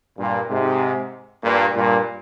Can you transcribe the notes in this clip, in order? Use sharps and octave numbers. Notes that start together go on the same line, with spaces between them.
G2 A#2
G#2 C3
G2 A#2
G2 A#2